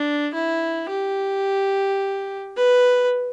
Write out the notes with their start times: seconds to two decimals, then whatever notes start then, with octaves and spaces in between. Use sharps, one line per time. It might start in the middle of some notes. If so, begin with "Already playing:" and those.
Already playing: D4
0.34 E4
0.90 G4
2.56 B4